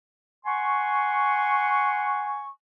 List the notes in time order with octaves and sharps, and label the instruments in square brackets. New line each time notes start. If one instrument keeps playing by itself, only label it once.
[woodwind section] F#5 G#5 C6 C#6